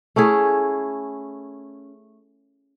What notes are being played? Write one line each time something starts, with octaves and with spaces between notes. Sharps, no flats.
A3 C#4 E4 G#4